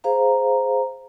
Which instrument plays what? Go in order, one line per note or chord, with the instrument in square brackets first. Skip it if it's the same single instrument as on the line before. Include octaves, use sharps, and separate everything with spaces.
[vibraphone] G#4 C5 F5 A#5